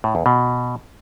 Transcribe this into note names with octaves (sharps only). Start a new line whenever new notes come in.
A2
E2
B2